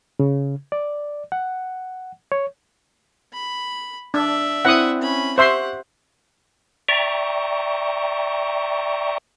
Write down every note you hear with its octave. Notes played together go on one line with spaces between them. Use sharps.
C#3
D5
F#5
C#5
B5
D4 D5 E5
C4 E4 F#5 D#6
C#4 B5
G4 C5 E5 F#5 C6 C#6 G6
D5 E5 G5 A#5 C#6